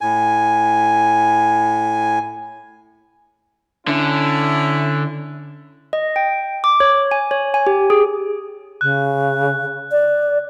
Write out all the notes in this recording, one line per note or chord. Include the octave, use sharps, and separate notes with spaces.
A2 G#5
D3 C#4 E4
D#5
G5
D6
C#5
G#5
C#5
G#5
G4
G#4
C#3 F#6
D5